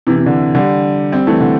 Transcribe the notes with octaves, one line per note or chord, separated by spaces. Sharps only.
C3 E3
C3
D3
D3 G3
G3 C4
E3 A3
D3